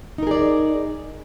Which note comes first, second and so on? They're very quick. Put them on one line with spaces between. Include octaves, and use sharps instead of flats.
D#4 A#4 G#4 D5